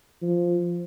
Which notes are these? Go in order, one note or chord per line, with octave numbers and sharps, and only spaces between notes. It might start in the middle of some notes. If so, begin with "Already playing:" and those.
F3